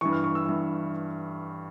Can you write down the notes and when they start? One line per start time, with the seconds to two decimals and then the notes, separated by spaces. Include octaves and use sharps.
0.01 G2 E3 C#6
0.13 F6
0.24 C#6
0.35 E6
0.46 G2 E3